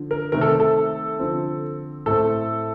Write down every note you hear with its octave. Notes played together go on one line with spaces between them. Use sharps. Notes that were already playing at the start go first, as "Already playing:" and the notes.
Already playing: D3 F3
A#4
C3 D#3 A3 C4 A#4
A4
A4
D3 F3 C4
A2 A3 C4 A4